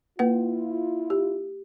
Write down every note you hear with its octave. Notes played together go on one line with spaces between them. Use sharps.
A#3 E4 F4 B4 F#5
G4